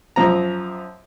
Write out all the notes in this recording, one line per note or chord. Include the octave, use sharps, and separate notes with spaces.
F#2 F3 A#5